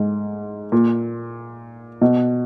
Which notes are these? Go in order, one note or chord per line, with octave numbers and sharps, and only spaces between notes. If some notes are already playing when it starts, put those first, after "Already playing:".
Already playing: G#2
A#2
B2